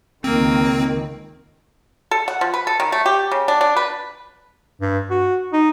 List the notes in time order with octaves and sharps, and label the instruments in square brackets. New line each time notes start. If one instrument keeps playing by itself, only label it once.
[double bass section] C#2 D#3 [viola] A#3 [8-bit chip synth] C4
[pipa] A4
F#5
F3
B4
A4
D#3
A3
G4
C#3
D4
D4
B4
[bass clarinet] G2
F#4
D#4